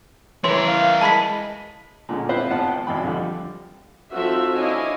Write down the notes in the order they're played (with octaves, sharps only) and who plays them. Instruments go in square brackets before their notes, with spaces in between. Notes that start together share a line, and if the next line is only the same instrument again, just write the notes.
[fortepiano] E3 [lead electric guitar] E4 A#4 [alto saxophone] C#5 [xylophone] C6
[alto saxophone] F5
[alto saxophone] G#3 [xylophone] A5 B5 B6
[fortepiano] A#2 D3 G#3 C#4
B3 C4 E4 F4 B4 C5
G#1 B3 F4 F#5 A5
G5
G#1 B2 E3 G5 B5
F2 D3 F3 G3
[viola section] F3 C4 D#4 F#4 A4 E5
D4 E4 C#5 D#5 F5 G#5